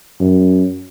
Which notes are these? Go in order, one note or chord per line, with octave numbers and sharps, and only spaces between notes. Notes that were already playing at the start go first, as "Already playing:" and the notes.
F#2